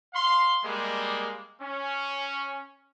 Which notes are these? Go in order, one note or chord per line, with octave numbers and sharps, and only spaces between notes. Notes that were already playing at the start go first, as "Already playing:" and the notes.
F5 C6
G3 G#3 A#3
C#4